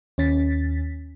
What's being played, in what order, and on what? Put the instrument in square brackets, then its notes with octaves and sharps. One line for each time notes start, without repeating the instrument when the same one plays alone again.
[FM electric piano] D#2 C#4 A6 B6